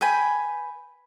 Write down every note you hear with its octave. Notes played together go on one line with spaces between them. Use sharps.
B4 G5 G#5 B5